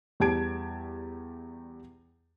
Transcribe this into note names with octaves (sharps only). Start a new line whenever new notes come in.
E2 G3 G4 A5 G#6 D7